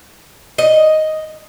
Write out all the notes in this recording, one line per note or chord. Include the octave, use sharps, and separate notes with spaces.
D#5